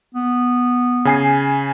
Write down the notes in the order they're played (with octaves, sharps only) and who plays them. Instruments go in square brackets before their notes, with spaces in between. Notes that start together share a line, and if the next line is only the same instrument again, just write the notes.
[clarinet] B3
[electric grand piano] C#3 G#5 C7